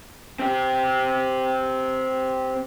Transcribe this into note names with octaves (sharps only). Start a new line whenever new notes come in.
C4 G4